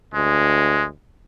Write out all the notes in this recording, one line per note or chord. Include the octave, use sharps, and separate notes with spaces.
D2 G#3